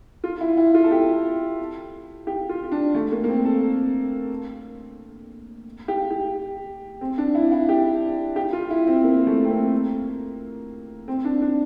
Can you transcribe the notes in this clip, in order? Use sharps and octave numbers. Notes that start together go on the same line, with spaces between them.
F4
E4
E4
F4
A4
G4
G4
F4
D4
A3
A#3
A#3
C4
A4
G4
G4
C4
D4
E4
E4
G4
G4
F4
E4
C4
A#3
A3
C4
A#3
C4
D4
D4